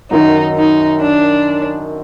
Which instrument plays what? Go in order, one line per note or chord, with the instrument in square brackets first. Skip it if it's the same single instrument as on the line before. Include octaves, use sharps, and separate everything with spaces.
[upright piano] F#2 D#3 F#3 [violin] D#4
[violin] D#4
D4